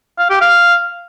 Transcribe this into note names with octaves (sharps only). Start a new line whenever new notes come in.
F5
G4
F5